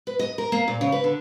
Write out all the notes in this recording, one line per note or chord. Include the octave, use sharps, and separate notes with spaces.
B4
D#5
A#4
A#3
A#2
C#3
B4
D3